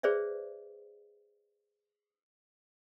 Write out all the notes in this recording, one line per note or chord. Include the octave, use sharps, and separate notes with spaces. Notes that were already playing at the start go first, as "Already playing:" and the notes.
G#4 B4 C5 D5 E5